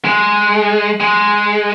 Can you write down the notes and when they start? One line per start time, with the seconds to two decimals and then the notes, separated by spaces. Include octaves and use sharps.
0.05 G#3
1.00 G#3